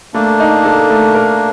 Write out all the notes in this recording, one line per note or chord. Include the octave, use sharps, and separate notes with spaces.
A3 A#3 D4
D#4
A4
A3
A#4